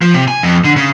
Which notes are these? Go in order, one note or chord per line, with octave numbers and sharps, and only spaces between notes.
F3
C3
G#5
F2
D3
C#3